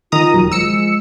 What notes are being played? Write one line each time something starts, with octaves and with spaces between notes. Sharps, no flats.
D#3 F4 A#5 D#6
E1 D#2 F#3
F3 G#3 E6 C#7